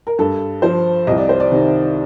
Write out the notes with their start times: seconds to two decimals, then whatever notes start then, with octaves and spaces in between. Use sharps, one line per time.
0.07 A#4
0.19 G2 A4
0.62 F3 C5
1.07 C2 D#5
1.18 D5
1.29 C5
1.40 D5
1.52 C3 D#3